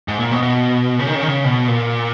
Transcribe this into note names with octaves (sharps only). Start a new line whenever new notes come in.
G#2
A#2
B2
B2
C#3
D#3
C#3
D#3
C#3
B2
A#2